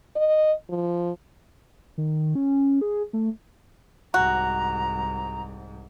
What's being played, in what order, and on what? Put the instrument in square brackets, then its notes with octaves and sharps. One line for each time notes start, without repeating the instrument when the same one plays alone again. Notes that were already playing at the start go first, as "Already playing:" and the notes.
[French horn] D#5
F3
[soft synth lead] D#3
C#4
G#4
A3
[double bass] C2 G#2 [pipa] F#4 [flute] A#5